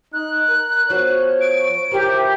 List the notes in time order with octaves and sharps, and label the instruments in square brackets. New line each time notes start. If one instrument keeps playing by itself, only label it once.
[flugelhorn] D#4 [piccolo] F#6
[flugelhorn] A#4
[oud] F3 B3 F#4 [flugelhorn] C#5
[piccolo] D7
[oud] E3 F3 [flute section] G4 [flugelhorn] A#4